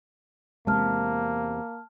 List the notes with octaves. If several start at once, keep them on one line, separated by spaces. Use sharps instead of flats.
E2 C3 G#3 A#3 C4 A5 F6